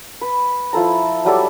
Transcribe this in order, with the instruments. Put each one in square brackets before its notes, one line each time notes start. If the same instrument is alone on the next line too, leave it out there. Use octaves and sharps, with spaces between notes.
[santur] B4
F3 E4 A4 A#5
F#3 G3 A4 D5